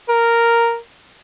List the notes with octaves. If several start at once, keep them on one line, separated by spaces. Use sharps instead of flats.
A#4